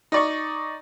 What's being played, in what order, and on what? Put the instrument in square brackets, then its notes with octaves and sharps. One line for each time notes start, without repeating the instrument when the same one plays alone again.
[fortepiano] D#4 D5 C#6